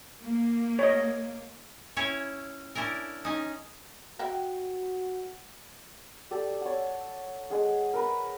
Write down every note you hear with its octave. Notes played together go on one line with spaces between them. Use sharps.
A#3
C#5 D#5
C#4 E4 C#5
C#4 D4 E4 A#4
C#4 D#4
F#4 E5 F#5 G5
G4 A4 D5
C#5 F#5
G#3 G#4 F#5
A#4 B4